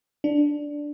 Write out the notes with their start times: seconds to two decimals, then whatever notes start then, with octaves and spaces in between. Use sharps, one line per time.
0.24 D4